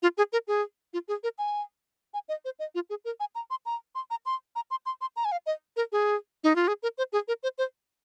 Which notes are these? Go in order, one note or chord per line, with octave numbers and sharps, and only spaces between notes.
F4
G#4
A#4
G#4
F4
G#4
A#4
G#5
G#5
D#5
C5
D#5
F4
G#4
A#4
G#5
A#5
C6
A#5
C6
A#5
C6
A#5
C6
C6
C6
A#5
G#5
F5
D#5
A#4
G#4
D#4
F4
G#4
A#4
C5
G#4
A#4
C5
C5